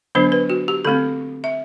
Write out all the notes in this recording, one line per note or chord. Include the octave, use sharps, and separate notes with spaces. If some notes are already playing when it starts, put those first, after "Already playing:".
D3 F#3 B3 D4 C5
B4
F#4
G4
D3 A3 C4 A4
E5